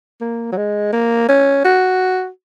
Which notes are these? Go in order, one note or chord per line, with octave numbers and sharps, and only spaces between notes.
A#3
F#3
G#3
A#3
C#4
F#4